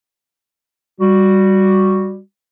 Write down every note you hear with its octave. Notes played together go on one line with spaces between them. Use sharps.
G3 F#4